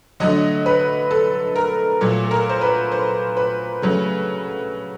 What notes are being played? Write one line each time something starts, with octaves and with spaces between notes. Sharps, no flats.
D3 F#3 A3 D#5
B4
A4
A#4
A#2 F#3 A3 A4
A4
A#4
C5
B4
C5
B4
C#3 F#3 A3